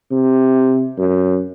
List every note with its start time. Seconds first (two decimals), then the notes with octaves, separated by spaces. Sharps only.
0.11 C3
0.98 F#2